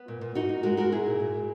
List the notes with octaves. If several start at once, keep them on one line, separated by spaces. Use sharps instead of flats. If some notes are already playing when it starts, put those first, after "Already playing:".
Already playing: B3
A#2
A#2
A#2 D#4 F#4
A#3
G#3 F#4 A#4
G#3 F#4 A#4
A#2 E4 G#4
A#2
A#2
A#2